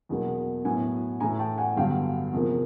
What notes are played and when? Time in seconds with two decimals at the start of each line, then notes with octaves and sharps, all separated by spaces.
0.09 E2 B2 F#3 A#3
0.65 A2 F#3 B3 F#5 G#5
1.20 A2 E3 A3 G#5 A#5
1.39 G5 A5
1.58 F#5 G#5
1.76 G2 D3 F#3 B3 F5 G5
2.33 E2 C3 F3 A#3